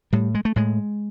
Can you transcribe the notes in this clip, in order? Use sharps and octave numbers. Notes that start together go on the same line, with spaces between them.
A2 G3
G#3
A3
A2 G#3